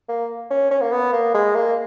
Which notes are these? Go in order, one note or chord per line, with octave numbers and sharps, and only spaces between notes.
A#3
C#4
C#4
A#3
B3
A#3
G#3
A#3